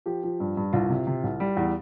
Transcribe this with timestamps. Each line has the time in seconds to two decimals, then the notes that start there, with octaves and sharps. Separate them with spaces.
0.06 F3 G4
0.23 F3
0.40 G2
0.57 G2
0.73 C2 F4
0.90 C3
1.07 C3
1.23 C2
1.40 G3
1.57 E2